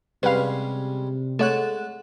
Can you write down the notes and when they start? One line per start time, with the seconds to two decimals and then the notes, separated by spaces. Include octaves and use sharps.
0.23 C3 G3 G#3 C#4 B4 F5
1.39 G#3 A3 A4 C#5 F#5 F#6